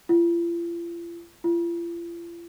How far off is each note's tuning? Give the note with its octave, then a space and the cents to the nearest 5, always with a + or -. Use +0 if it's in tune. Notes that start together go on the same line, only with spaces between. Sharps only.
F4 -40
F4 -40